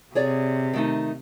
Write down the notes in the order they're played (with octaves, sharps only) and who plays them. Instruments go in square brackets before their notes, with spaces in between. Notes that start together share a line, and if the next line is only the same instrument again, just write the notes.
[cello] C3 [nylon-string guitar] G#4 C#5 D5
[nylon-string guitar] D#3 A3 D#4